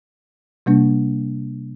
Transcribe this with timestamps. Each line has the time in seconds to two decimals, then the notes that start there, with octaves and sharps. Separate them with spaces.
0.66 C3 G3 A#3 D4